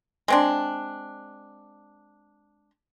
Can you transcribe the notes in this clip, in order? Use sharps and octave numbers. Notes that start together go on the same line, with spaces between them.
G#3 C4 D4